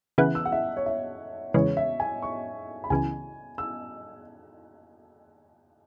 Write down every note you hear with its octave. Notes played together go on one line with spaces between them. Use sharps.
C#3 E3 B3 E4 F#6
E6
F#5
E5
C#5
E5
E2 C#3 E3 G#3 C#5
E5
G#5
C#6
B5
C#2 C#3 E3 G#5
E6